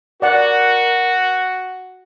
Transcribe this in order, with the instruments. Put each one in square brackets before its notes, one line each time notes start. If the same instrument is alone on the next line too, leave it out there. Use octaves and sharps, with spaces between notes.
[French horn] F#4 [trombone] A#4 [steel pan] D5 F#5